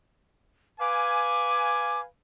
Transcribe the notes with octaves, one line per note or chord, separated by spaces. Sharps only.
B4 F5 G#5 D6